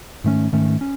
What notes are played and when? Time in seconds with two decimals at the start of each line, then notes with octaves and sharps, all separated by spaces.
0.24 G#2 D#3 A3 C#4
0.53 G#2 D#3 A3 C#4
0.81 C#4